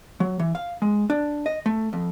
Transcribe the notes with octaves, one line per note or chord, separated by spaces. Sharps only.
F#3
E3
F5
G#3
D4
D#5
A3
F2